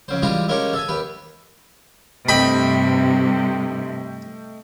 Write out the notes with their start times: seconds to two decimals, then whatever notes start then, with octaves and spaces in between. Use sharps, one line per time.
0.08 F2 C#3 C5
0.22 E3 G3 G#3 F4 G4 D#5
0.48 G#3 A#3 C#4 D#4 G4 C#5
0.73 A4 E5 G#5
0.88 D#2 G4 B4
2.29 G2 C3 A3 D#5 G5 B5